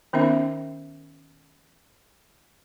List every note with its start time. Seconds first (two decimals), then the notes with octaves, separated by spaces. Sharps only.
0.13 D#3 B3 C#4 D#4 A#4 E5